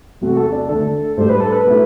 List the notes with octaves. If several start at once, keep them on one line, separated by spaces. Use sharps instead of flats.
E2 C3 F#3 A3 C4 F#4
A4
D4
D2 D3 A3 A4
A2 G3 D4 G4 C5 D5
B4
A4
B4
B2 A3 E4